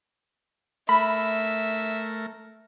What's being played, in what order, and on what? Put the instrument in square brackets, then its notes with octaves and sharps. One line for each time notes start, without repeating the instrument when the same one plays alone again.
[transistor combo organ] A3 A#4 [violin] E5 [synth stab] B5